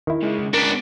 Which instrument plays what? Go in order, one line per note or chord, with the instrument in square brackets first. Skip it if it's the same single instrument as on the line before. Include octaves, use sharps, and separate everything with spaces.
[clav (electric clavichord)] D#3 E4
[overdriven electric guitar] C#3 G#3
[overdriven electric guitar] C#2 [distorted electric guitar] B3 D4 [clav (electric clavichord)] A#4